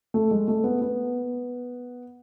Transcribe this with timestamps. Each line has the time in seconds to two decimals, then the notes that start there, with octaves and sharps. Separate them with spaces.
0.14 A3
0.31 G#3
0.48 A3
0.64 B3
0.81 B3